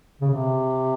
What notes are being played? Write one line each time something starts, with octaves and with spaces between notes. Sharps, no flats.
C#3
C3